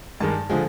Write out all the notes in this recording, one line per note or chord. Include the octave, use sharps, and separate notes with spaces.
G2 D#3 G#3 A5
D3 F3 G#3 G#5